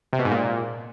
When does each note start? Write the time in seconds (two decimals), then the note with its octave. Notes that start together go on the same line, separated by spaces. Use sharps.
0.13 C3
0.19 B2
0.25 G#2
0.32 A#2